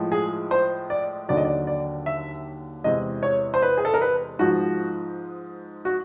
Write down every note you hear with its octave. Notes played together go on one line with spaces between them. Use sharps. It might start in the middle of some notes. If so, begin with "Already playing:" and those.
Already playing: A2 F3 G#3
G#4
C5
D5
D#2 D3 F#3 D5
D#5
D5
D5
E5
E2 C3 E3 G#3 D#5
C#5
C5
B4
G#4
A4
A#4
B4
G#2 F3 G#3 F#4
F#4